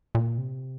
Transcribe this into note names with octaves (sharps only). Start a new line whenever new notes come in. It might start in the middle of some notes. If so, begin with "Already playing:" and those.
A#2
C3